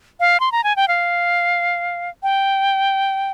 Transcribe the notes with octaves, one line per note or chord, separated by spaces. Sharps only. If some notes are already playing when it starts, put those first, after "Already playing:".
F5
C6
A#5
G#5
G5
F5
G5